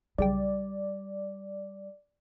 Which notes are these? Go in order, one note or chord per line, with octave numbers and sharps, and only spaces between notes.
B1 C#3 G3 D5 G5